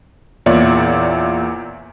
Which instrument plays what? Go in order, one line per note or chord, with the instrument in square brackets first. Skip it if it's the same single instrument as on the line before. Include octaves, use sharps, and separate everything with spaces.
[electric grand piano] E2 A#2 C#5 D5 E5